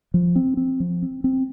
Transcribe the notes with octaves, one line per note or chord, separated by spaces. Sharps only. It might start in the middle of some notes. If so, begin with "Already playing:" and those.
F3
C4
C4
F3
C4
C4